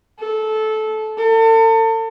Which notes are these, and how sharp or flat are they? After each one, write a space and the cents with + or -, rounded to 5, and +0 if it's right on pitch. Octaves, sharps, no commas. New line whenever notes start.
A4 -20
A4 +40